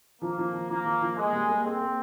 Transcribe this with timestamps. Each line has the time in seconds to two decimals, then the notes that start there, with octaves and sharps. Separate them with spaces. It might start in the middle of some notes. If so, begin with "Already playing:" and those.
0.22 F3 A#3
0.38 F3
0.53 F3
0.70 F3 A#3
0.86 F3
1.01 F3
1.17 G#3 A#3
1.33 G3
1.49 A#3
1.64 C4 G#4
1.81 A#3